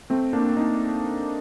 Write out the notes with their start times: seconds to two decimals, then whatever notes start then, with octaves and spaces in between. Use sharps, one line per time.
0.10 A3 C4
0.33 A#3 D4
0.57 C4 D#4